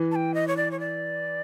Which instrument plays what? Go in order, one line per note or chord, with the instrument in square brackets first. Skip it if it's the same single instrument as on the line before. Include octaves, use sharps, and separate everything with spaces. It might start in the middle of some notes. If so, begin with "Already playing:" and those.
Already playing: [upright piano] E3
[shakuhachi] A5
G5
D#5
C#5
D5
C#5
D5